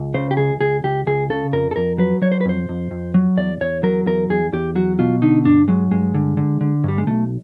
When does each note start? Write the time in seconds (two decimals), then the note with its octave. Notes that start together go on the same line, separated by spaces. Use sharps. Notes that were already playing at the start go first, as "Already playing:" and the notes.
Already playing: C#2
0.14 C#3 C5
0.31 G4
0.37 C#2 G#4
0.60 C#2 G#4
0.84 C#2 G4
1.07 C#2 G#4
1.30 C#3 A4
1.53 F2 A#4
1.71 A4
1.76 F2 A#4
1.98 F#3 B4
2.22 F#3 C#5
2.32 C5
2.41 B4
2.45 F2 C5
2.69 F2
2.91 F2
3.14 F#3
3.37 E2 D5
3.61 E2 C#5
3.83 F#3 A#4
4.06 E2 A#4
4.30 E2 G#4
4.53 E2 G4
4.75 F#3 F#4
4.99 B2 F4
5.22 D3 D#4
5.45 G2 D4
5.68 F#3 G#3
5.91 G2 G#3
6.14 D3
6.37 D3
6.61 D3
6.84 G2 G3
6.98 G#3
7.07 B1 A3